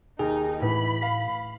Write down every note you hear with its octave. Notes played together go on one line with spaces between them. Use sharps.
D#2 D#4 G#4
A2 E3 B5
F5